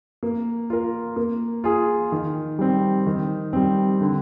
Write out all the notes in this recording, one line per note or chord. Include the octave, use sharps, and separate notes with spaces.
A#3
F4 A#4
A#3
F4 G#4
D#3
G3 C4
D#3
G3 C4
D3